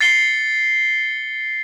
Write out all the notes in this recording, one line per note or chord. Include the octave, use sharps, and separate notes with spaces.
A6 C7 C#7 G7